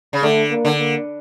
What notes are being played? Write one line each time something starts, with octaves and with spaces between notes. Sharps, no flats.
C#3
D3 A3
A#3
D3
A#3